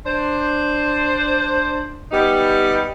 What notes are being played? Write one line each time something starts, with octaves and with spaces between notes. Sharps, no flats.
D4 C5
G3 B3 D#4 G4